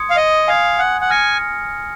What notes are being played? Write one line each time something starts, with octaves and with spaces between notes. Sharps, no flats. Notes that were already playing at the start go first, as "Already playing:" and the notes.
Already playing: C6 D#6 G#6 C#7
F5
D#5
F5 G#5 D#6 G#6
F#5
F#5
G#5 F6 A#6 C#7